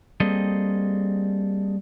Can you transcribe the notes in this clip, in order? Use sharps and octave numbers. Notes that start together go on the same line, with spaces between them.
G3 A#3 C4 G#4 A4 D#5